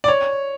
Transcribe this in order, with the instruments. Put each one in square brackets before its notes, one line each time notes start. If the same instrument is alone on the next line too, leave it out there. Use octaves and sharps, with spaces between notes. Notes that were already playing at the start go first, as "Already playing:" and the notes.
[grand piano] D5
C#5